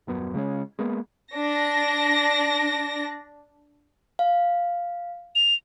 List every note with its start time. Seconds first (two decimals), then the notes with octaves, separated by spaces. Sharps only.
0.07 D#1 F#2 B3
0.34 C#3 G#3 A3 C#4
0.79 G#3 A#3 B3
1.33 D4 A#6
4.19 F5
5.35 F7